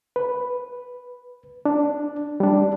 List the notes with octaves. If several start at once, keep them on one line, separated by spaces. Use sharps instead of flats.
B4
D4
G3 D4